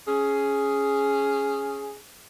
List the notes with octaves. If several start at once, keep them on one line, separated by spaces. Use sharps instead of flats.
C#4 G#4